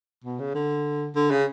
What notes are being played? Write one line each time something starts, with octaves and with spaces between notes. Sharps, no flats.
B2
C#3
D3
D3
C#3